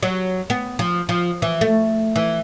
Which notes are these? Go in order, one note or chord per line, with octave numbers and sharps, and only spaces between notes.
F#3
B3
F3
F3
E3
A3
E3